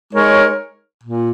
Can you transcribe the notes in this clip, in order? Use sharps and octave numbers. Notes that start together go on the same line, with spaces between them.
G#3 D#4 A#4 C#5
A#2